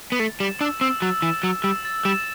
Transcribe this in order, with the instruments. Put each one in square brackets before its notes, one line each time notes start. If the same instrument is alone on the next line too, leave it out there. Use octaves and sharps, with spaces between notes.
[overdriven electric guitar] B3
[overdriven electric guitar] A3 [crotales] A6
[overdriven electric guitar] G3 [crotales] E7
[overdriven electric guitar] D4 [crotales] E6
[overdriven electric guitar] C4 [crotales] E6
[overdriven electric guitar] F#3 [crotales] A6
[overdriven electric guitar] E3 [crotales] E7
[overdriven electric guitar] F#3 [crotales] E6
[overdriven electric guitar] G3 [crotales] E6
[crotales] A6
[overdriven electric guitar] G3 [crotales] E7